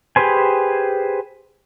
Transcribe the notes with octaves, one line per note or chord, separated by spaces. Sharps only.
G4 G#4 B4 C5 G#5